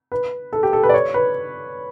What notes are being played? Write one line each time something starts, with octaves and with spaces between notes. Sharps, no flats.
B4
A4
G4
A4
B4
D5
C#5
B4